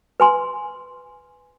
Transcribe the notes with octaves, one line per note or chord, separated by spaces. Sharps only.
B4 G#5 C6